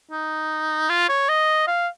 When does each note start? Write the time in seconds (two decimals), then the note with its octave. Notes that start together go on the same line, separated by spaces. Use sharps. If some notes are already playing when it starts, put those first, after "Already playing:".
0.11 D#4
0.89 F4
1.09 C#5
1.29 D#5
1.67 F5